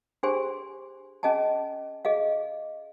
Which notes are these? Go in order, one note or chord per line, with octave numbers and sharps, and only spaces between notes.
D4 G4 G#4 C5 G#5 C6
C#4 G#4 D#5 G#5 A5
G#4 D#5 F5